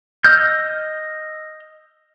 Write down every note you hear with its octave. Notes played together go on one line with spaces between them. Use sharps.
D#5 E6 F6 G6